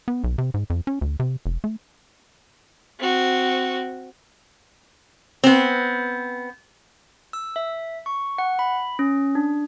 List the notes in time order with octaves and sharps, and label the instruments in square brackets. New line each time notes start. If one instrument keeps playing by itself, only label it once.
[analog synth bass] B3
B1
C3
G#2
F2
C#4
D2
C3
F1
A3
[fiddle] C4 F#4
[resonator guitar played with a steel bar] B3 C4
[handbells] E6
E5
C#6
F#5
B5
C#4
D4